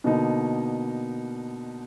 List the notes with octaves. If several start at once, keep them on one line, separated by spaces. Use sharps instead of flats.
B2 D3 A#3 B3 D#4